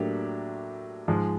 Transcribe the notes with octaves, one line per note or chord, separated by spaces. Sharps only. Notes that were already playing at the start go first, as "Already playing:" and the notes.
Already playing: A2 F#3 A#3 D4 G4
G#2 F3 G#3